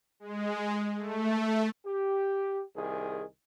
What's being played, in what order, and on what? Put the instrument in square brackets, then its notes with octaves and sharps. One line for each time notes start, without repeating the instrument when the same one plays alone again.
[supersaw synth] G#3
A3
[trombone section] G4
C2 D#3 G#4